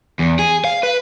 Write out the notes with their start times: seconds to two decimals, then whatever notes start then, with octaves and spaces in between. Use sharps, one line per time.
0.19 E2
0.39 G#4
0.65 F5
0.83 B4